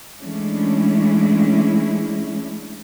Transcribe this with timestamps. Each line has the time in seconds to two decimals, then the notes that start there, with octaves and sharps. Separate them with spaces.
0.21 E3 G#3 A3 C#4 D4 E4